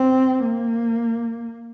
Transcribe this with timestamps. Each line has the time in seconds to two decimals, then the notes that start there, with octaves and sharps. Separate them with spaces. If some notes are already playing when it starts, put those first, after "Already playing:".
Already playing: C4
0.44 A#3